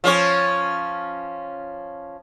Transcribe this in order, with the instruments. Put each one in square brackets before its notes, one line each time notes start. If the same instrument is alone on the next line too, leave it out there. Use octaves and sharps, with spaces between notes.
[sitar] F3 C#4 C#5